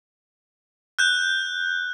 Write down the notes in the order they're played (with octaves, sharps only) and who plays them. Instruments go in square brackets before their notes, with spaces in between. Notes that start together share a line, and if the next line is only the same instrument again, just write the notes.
[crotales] F#6 G6